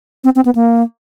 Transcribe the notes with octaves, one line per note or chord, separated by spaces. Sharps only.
C4
C4
B3
A#3